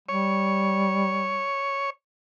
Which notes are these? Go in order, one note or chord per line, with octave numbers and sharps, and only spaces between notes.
G3 C#5